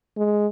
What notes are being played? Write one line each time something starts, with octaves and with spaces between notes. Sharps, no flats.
G#3